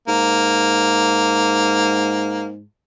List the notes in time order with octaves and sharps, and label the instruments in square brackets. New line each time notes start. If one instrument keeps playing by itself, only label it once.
[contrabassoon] G#2 [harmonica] A#3